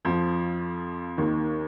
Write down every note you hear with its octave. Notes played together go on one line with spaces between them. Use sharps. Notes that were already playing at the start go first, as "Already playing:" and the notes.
F2 F3
D#2 D#3